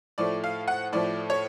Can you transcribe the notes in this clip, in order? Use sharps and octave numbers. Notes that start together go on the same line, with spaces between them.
A2 F3 A3 D5
F5
F#5
A2 F3 A3 D5
C#5